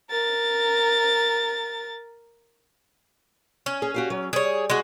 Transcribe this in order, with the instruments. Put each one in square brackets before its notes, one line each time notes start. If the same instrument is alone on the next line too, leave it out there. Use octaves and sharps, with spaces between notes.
[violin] A#4 A6
[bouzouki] C#4
[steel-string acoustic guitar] G#4
F#4 G4 F5
F#3
[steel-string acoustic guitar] G3 [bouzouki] G#4 C#5
[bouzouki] G#3 F#4